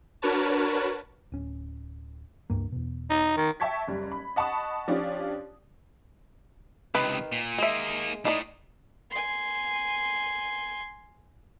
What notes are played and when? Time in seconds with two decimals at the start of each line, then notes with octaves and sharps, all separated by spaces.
0.22 D4 F#4 A#4 B4 C#5 A5
1.32 D1 C#4
2.50 C#2 G2 A#3
2.72 E2 B2
3.10 D#4
3.37 D#3
3.60 E5 G5 A5 C#6 G#6 B6
3.88 F#1 G3
4.12 B5
4.36 D#5 F#5 A5 B5 C#6 D#6
4.88 F3 C#4 D4 F4 G4
6.95 C#2 C3 D#3 B4
7.32 A#2
7.58 G#3 A#3 D#4 E5
8.25 A2 D#4 D5 D#5
9.11 G#5 C6